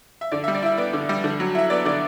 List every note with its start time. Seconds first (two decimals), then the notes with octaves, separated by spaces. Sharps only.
0.21 E5
0.32 D3 D5
0.44 E5
0.48 G3
0.55 D5
0.62 E4 E5
0.77 B3 D5
0.93 D3
1.09 G3
1.24 D3
1.40 F#3
1.55 E4 E5
1.70 B3 D5
1.85 D3 D5